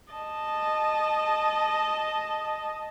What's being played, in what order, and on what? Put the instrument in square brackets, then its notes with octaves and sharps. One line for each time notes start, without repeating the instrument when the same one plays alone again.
[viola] D#5 A5